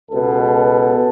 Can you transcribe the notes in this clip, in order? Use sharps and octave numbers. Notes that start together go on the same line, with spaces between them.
C#2 B2 B3 A4